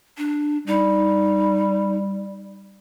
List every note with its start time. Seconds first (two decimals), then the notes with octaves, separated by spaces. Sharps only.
0.18 D4
0.67 G3 D#4